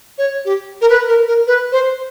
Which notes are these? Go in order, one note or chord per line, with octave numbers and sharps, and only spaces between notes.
C#5
G4
A#4
B4
A#4
A#4
B4
C5